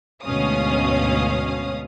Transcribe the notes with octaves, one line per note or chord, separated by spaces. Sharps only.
D2 G#2 B2 C#4 F5 D#6